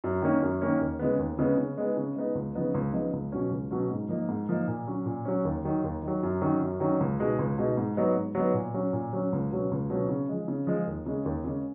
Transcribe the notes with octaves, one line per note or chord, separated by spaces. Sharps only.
F#2
D#3 A#3 C#4
F#2
D#3 A#3 C#4
D#2
C#3 G#3 B3
D#2
C#3 G#3 B3
C#3
G#3 B3 D#4
C#3
G#3 B3 D#4
C#2
C#3 F3 B3 D#4
C#2
C#3 F3 B3 D#4
C#2
B2 F#3 C#4
C#2
B2 F#3 C#4
G#2
F3 A#3 D#4
G#2
F3 A#3 D#4
A#2
F#3 C#4
A#2
F#3 C#4
D#2
D#3 F#3
D#2
D#3 F#3
F#2
D#3 F#3 C#4
F#2
D#3 F#3 C#4
C#2
B2 G#3 D#4
C#2
B2 G#3 D#4
G#2
F#3 B3 D#4
G#2
F#3 B3 D#4
A#2
F#3 C#4
A#2
F#3 C#4
C#2
B2 F#3 C#4
C#2
B2 F#3 C#4
C#3
F3 G#3
C#3
F3 G#3
D#2
C#3 G#3
D#2
C#3 G#3